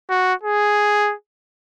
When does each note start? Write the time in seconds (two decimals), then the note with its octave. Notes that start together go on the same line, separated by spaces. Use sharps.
0.10 F#4
0.43 G#4